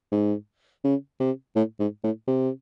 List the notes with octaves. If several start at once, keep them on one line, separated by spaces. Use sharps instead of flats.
G#2
C#3
C3
A2
G#2
A2
C3